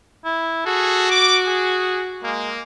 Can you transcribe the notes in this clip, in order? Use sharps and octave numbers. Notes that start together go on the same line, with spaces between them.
E4
F#4 G#4 A4
D6
G#4
G#3 A#3